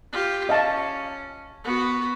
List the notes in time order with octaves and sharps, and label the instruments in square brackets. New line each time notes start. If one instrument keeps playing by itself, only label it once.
[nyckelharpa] F4 G4
[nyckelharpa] C#4 [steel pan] D#5 F5 A5
[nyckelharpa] B3 F#4